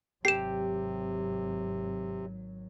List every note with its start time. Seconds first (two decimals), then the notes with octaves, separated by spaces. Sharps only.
0.25 G#1 C3 F#3 G4 C7 E7